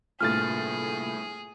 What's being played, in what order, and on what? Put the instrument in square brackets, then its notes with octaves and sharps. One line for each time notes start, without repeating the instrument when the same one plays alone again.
[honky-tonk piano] G1 A2 A6 [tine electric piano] C3 A#3 F4 [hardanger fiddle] G#4 [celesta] F6